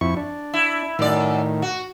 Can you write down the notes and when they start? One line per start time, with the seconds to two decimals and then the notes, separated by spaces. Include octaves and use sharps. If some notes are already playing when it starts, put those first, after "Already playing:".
0.01 F2 E4 C#6
0.17 D4
0.54 E4
0.99 F#2 A2 D#3 D5
1.62 F#4